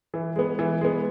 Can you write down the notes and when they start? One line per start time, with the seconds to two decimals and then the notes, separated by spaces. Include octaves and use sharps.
0.14 E3
0.36 G#3 B3
0.59 E3
0.81 G#3 B3